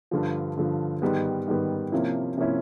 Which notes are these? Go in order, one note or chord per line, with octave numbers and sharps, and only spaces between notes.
G2 D3 F3
G2 D3 F3
G#2 D#3 G3 B3
G#2 D#3 G3 B3
C3 F3 A#3 C#4 E4
C3 F3 A#3 C#4 E4